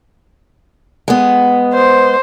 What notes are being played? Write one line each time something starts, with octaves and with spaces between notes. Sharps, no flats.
G#3 B3
C5